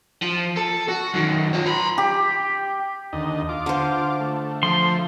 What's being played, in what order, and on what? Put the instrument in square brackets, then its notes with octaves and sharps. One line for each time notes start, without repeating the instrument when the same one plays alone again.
[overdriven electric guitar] F3
A4
F#4
F#2 D#3
F4 C#5
A#5 B5
[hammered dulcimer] G4
[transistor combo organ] D#2 D3 D#5
F4 D6
[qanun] D3 C5
[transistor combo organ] A3
[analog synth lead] F3 [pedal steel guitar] C6